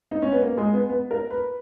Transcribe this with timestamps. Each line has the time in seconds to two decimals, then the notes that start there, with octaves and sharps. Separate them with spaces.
0.11 D#4
0.22 C#4
0.32 B3
0.42 A#3
0.57 G#3
0.73 B3
0.89 B3
1.11 A#4
1.30 B4